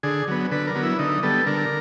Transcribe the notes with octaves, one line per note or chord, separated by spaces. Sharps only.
D3 G#4
F#3 B3
D3 B4
A#4
F#3 B3
E4
D3 D#4
G3 B3 A4
D3 A#4